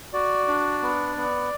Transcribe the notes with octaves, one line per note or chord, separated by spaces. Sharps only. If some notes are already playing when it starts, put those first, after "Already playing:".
F#4 D5
D4
B3
B3